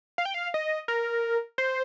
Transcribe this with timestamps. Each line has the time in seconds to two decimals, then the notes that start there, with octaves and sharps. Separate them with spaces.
0.18 F5
0.25 G5
0.34 F5
0.54 D#5
0.88 A#4
1.58 C5